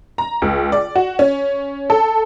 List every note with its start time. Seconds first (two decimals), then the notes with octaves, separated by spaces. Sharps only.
0.18 A#5
0.42 C#2
0.72 D5
0.96 F#4
1.19 C#4
1.90 A4